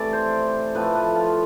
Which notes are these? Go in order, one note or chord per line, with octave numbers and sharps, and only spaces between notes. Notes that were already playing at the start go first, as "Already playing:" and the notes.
Already playing: C3 E3 A3 D5
C5
A2 F3 A3 B4
B4
F4